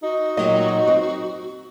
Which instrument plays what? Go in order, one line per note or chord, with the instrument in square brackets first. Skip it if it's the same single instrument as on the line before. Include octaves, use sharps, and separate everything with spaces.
[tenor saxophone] D#4 [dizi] F#4
[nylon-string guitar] A#2 F#3 G4 [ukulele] D#5
[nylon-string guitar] C4